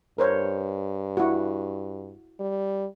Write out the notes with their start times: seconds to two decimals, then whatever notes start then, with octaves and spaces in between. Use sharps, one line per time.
0.18 G2 A#4 C5 C#5
1.17 E4 F#4
2.40 G3